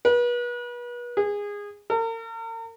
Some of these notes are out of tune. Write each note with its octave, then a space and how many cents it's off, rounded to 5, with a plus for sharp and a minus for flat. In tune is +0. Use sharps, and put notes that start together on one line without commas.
B4 -35
G#4 -20
A#4 -40